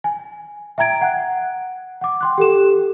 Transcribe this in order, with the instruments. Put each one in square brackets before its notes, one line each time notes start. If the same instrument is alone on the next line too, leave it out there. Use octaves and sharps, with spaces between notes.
[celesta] G#5
E5 G5 A#5 G#6 D7
F#5 F#6
F#5 D6
G5 C6 F#6
G4 A4 E7